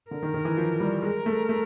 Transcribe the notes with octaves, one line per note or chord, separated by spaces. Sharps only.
D3 A#4
D#3
D#3
E3
F3
G3
G#3 A#4
A3
A3